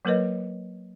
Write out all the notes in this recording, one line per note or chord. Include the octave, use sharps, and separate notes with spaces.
F#3 A#3 A#4 B4 C#5 D#5